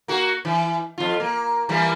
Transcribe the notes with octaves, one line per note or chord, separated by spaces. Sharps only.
A#3 F#4
E3
F2 F4
A#3
E3 G3 A#3